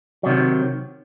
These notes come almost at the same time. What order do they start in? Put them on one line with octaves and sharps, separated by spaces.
F#3 C3 D#3